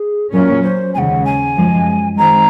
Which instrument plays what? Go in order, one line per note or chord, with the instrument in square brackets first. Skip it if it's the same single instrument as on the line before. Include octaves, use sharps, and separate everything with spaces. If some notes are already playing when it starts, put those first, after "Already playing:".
Already playing: [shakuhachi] G#4
[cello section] A#2 F#3 C#4 [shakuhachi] A#4
[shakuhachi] C5
[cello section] D#2 C#3 G#3 [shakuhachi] F#5 G#5
[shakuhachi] G#5
[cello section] F#2 F3 G#3
[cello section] D#3 G#3 C4 [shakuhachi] A#5